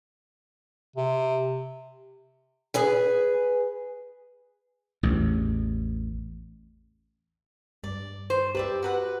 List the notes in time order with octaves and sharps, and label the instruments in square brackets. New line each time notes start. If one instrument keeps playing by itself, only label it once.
[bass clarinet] C3
[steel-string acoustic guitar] G#4 B4 G#5
[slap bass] A1 E2
[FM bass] G2 [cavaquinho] D5
[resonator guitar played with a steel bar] C5
[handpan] G4 [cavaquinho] B4 D5 E5
[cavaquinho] F#4 B4 F#5